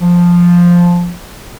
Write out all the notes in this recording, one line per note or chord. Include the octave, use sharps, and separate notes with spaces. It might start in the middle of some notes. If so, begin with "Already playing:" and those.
F3